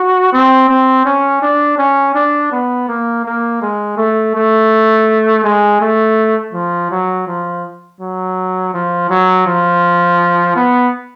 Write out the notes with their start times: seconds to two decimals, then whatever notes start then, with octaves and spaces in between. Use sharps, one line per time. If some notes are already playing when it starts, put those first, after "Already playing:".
Already playing: F#4
0.33 C4
0.69 C4
1.05 C#4
1.42 D4
1.78 C#4
2.15 D4
2.52 B3
2.88 A#3
3.25 A#3
3.62 G#3
3.98 A3
4.35 A3
5.44 G#3
5.81 A3
6.53 F3
6.91 F#3
7.27 F3
8.01 F#3
8.74 F3
9.10 F#3
9.47 F3
10.56 B3